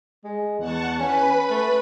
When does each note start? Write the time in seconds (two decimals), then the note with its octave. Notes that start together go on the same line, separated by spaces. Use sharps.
0.24 G#3
0.59 E2 F#5 A5 C#6
1.00 C#4 B4 B5
1.50 A3